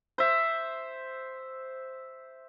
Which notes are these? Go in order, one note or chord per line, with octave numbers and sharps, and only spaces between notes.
C5 E5